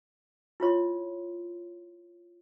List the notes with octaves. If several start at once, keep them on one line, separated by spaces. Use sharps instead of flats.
E4 F4 C#5 C6